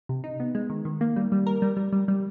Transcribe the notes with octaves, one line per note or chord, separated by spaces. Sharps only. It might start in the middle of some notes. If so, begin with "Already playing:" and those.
C3
D#4
B3
G#3
D#3
D#3
A#3
G3
G3
A#4
G3
G3
G3
G3